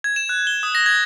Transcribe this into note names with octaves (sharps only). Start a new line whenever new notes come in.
G#6
E7
F#6
G7
D#6
A#6
G#6